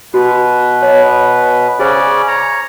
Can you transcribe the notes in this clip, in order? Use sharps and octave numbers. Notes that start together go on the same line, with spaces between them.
B2 F#4 B4
C#5 D#5
C#3 C#4 G#4 C5 D5 G#5
C#5 A#5